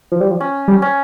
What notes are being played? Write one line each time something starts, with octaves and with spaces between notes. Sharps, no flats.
F3
G3
F3
C#4
G3
C#4